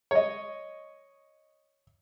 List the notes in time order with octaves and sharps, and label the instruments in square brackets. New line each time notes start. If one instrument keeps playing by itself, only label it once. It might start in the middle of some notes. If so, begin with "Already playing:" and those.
[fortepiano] C#5 D#5